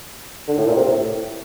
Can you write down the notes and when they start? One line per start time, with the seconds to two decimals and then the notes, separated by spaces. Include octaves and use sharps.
0.48 D3
0.58 A2
0.67 A#2
0.77 C3
0.86 A2